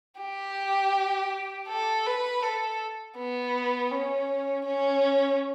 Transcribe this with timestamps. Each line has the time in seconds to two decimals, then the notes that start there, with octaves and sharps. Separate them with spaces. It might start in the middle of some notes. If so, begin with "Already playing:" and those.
0.20 G4
1.68 A4
2.06 B4
2.43 A4
3.18 B3
3.91 C#4
4.65 C#4